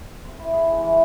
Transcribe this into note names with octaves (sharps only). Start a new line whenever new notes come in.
C4
E4
G#4
G#3
E3